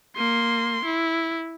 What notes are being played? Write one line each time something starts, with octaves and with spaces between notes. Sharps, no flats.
A#3 C6
E4